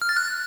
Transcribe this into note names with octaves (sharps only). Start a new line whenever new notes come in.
F6
A6
F#6